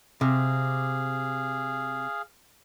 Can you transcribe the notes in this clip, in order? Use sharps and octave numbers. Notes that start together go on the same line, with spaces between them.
C3 G#4 F5